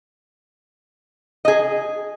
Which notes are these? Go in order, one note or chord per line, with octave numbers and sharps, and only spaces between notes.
G#4 D#5